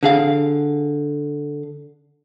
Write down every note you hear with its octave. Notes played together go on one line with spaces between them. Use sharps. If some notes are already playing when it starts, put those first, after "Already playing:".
D3 G#4 F5